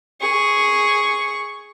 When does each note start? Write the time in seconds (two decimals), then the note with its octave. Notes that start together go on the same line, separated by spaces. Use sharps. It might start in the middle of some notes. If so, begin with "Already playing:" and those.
0.21 G#4 C#6